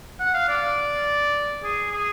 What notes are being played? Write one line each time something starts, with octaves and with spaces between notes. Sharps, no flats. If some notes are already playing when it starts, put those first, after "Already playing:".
F#5
F5
D5
G#4
G#4